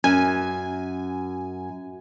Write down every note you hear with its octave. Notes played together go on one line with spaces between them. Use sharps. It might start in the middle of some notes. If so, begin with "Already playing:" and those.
F#2 C#4 G#5